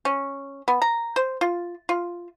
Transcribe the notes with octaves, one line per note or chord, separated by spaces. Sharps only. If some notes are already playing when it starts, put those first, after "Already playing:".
C#4
B3
A#5
C5
F4
F4